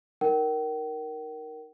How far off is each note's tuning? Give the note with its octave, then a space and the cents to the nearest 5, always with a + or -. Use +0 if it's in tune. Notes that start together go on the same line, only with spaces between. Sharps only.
D#4 +0 A#4 +0 G5 -40